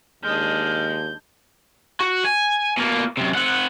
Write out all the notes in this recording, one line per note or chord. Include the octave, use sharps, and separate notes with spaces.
D#2 G#3 D4 F6 G6
F#4
G#5
B2 A#3
F#2 C3
C4 F#5